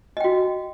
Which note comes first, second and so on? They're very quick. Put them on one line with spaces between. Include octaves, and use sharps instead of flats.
D#5 G5 F#4